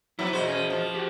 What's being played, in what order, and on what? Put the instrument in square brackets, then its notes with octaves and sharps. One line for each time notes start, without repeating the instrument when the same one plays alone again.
[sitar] C3 F#3 B3 [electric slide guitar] E4
[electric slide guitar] F#4 G#4 D#5 [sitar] C5
[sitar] C#4
F3
[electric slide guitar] F#4 G4